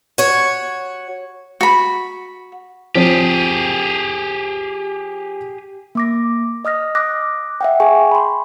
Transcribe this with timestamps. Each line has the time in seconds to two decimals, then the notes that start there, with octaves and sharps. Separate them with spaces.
0.18 F#4 C#5
1.61 F#4 B5
2.95 F3 C4 G4 G#4
5.95 A#3 D6 A#6
6.65 D#5 D#6 F6 A#6
6.95 D6 D#6 F#6 A#6
7.61 E5 F#5 G5
7.80 G#4 G5 G#5 C#6
8.11 B5 C6